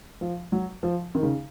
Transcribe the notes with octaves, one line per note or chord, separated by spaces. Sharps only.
F3
F#3
F3
D#3
C#3